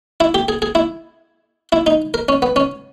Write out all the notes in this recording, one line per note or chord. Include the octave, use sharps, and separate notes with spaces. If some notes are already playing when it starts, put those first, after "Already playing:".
E4
G4
G#4
G#4
E4
E4
D#4
A#4
C#4
B3
C#4